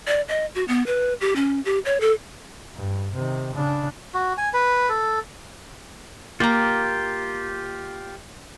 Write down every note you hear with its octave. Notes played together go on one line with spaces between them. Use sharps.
D5
D#5
F#4
B3
B4
G4
C#4
G4
C#5
A4
G2
C3 D#3
C#3 D4
F#4
G#5
B4
A4
A#3 F4 G4 A#5